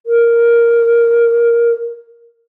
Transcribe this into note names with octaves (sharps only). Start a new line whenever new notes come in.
A#4